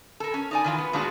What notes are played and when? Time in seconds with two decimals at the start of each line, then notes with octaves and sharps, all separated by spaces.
0.20 A4 A#4
0.34 C#4
0.51 D#4 D5 G#5
0.64 D#3 E3 F4
0.78 B3
0.93 A#2 G#3 D4 F4 F#4